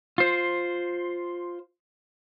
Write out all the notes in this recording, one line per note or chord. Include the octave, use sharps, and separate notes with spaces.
F4 C5